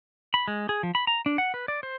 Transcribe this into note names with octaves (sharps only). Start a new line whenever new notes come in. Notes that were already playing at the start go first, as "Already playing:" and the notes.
B5
G#3
G#4
F3
B5
A#5
D4
F#5
B4
D5
C5